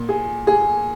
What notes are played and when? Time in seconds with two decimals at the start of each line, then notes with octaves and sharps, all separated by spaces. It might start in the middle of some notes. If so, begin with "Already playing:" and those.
Already playing: A#2
0.09 G#4
0.47 G#4